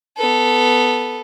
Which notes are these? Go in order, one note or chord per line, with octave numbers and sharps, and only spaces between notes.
B3 A4